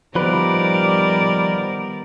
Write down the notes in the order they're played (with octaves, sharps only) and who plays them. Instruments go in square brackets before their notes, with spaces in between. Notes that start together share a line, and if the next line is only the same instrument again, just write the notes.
[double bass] D#3 B3 [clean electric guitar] F3 B4 [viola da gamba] G3 A#4 D5